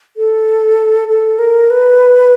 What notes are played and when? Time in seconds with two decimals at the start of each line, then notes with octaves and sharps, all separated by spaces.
0.17 A4
1.08 A4
1.39 A#4
1.70 B4